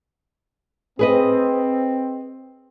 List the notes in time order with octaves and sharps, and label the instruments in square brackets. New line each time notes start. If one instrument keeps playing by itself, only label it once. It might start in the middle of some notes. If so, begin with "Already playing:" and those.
[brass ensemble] C4 [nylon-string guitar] G#4 B4 D#5